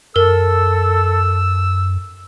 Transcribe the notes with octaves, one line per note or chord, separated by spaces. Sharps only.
F#2 A4 A#4 E6